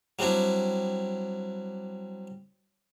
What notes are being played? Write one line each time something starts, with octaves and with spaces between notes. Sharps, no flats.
F#3 G3 C4 D4 E4